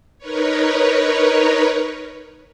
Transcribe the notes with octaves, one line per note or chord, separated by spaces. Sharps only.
D#4 A#4 B4 C#5